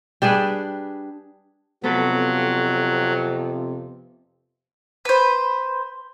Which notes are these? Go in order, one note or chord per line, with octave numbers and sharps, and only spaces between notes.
G3 D4 G#4 B4
F2 C3 F#3 B3 A4 B4
B4 C5